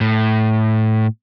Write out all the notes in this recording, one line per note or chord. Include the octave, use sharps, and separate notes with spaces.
A2